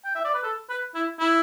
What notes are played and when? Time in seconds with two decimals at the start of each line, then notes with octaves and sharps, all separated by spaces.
0.05 G5
0.15 E5
0.25 D5
0.34 B4
0.43 A4
0.70 B4
0.95 E4
1.19 E4